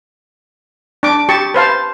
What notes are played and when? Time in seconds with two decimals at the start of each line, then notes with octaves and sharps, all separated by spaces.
1.03 D4 D6
1.29 G4 A5 C#6
1.54 B4 C5 F5 A5